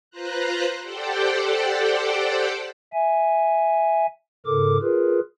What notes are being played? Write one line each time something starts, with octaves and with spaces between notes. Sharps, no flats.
F4 B4 C5 A#5 F#6
G4 A4 C5 D5 F#5 G5
E5 G#5
G#2 C#3 A4 A#4 D6
F4 G#4 A#4 B4